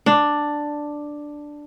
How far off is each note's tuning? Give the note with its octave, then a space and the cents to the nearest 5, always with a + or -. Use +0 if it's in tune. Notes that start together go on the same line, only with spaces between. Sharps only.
D4 +5